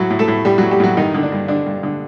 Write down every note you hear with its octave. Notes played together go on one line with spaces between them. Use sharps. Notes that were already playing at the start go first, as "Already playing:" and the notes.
Already playing: A2 F#3 F#4
A2
A3 A4
A2
A2 G3 G4
F#3 F#4
A2
G3 G4
A2 F#3 F#4
G2 D#3 D#4
D3
D4
G2
D3 D4
G2
D3